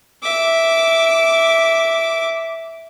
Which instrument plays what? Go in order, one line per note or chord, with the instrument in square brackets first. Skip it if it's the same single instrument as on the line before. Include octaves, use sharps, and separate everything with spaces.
[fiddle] E5 D6